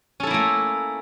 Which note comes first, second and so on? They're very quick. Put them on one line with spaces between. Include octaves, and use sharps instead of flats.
C#4 A4 E4 A#3 A3